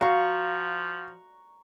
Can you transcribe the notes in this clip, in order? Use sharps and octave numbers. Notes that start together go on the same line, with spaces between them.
F3 F#4 F5 A#5 C#6